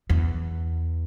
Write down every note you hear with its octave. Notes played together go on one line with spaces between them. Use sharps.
E2